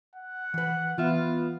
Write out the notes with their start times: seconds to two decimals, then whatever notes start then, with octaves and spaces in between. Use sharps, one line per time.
0.16 F#5
0.54 E3 B4
0.98 E3 B3 F4 E5